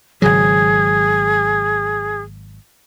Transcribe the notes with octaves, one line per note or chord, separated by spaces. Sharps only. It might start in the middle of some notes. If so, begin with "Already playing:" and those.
G#1 C#3 F#3 G#4